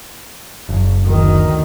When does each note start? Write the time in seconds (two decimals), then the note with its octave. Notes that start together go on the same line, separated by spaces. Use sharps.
0.69 F#1
1.01 D2 D#3